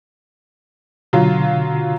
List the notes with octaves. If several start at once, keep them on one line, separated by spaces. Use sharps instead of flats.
B2 D3 F#3 F4